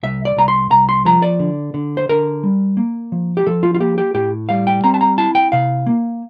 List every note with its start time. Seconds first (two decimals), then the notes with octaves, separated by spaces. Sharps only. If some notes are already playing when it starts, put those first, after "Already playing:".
0.03 C2 E5
0.25 D5
0.36 C2 A#5
0.48 C6
0.71 C2 A#5
0.89 C6
1.05 F3 A#5
1.22 D5
1.40 D3
1.74 D3
1.97 C5
2.09 D3 A#4
2.43 G3
2.77 A#3
3.12 F3
3.37 G4
3.47 F3 A4
3.63 F4
3.74 F4
3.80 A#3 G4
3.98 G4
4.14 A2 G4
4.49 G3 F5
4.67 G5
4.84 C4 A#5
4.94 A5
5.01 A#5
5.18 E4 A5
5.35 G5
5.52 C3 F5
5.87 A#3